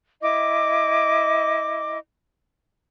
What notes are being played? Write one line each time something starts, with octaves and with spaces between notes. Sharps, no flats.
E4 D#5 D6